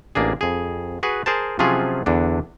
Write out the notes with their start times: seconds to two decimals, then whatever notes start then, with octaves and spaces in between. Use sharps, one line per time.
0.15 A1 A#3 D4 G#4
0.41 F2 G#4
1.03 F#4 G#4 B4
1.26 G#4 A#4 C5 A5
1.59 C3 F3 F#3 C#4 F4 G#4
2.06 E2 D3 D4